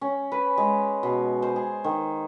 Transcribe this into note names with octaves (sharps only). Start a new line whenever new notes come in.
C#4
B4
G#3
B2
C5
G#4
D#3